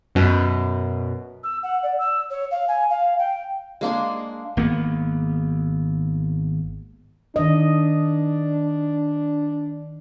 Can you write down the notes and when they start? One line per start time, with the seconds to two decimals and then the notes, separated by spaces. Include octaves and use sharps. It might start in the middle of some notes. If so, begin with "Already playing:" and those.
0.15 F#2 B2
1.43 E6
1.63 F#5
1.82 D5
1.98 E6
2.30 C#5
2.51 F5
2.67 G#5
2.89 F5
3.18 G5
3.81 G#3 A#3 D4 G#4
4.57 G#1 A#3 B3
7.36 D#3 D4 D#5